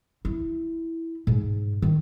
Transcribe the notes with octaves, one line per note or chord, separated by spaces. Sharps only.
E4
G#2
D#3